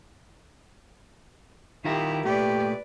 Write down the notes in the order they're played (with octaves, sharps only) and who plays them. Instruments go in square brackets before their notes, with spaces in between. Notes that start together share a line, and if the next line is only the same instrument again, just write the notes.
[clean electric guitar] D#3 F4 A#4 [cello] E4 G4
[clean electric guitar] A#2 A3 [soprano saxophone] G4 [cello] B4 D5